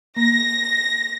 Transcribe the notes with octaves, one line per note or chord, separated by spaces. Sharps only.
A#3 A#6